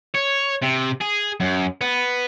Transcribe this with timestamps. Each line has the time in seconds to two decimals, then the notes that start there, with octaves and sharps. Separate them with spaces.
0.14 C#5
0.62 C3
1.01 G#4
1.40 F#2
1.81 B3